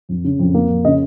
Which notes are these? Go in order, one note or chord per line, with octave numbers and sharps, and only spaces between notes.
F2
C#3
F2
A#3
F2
C#3 D#5